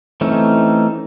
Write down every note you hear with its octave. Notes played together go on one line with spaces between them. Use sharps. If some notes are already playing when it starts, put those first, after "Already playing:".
E3 A3 C4 C#4 D#4